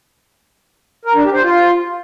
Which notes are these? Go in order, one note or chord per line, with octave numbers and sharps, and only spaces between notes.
A#4
D4
G4
C5
F4